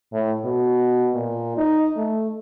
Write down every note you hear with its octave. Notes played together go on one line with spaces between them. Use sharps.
A2
B2
A#2
D#4
A3